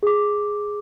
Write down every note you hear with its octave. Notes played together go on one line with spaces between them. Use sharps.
G#4 D6